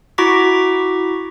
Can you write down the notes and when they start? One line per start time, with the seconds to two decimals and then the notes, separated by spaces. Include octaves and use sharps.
0.18 E4 F#4 A#5 C#6 D6 B6